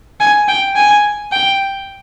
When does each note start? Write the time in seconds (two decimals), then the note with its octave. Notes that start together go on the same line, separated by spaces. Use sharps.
0.20 G#5
0.48 G5
0.76 G#5
1.32 G5